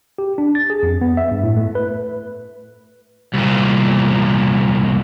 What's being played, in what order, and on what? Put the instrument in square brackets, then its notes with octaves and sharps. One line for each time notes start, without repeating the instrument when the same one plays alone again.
[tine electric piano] G4
D4
A6
G#4
F2
B3
E5
G2
A2
A3
B4
[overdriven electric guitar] C2 A#2